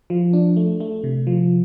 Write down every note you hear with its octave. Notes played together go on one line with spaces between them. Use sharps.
F3
D4
A3
A3
C3
F3